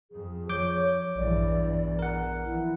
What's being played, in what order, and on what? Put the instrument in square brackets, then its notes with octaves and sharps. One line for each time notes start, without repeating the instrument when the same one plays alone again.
[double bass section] F2 [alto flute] G#4
[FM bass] F3 [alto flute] C#5 [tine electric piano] D6 G6
[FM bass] A#1 [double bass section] E2 G2 E3 [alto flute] D5
[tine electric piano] A#4 F#5
[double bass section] E3 F3 [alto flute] E4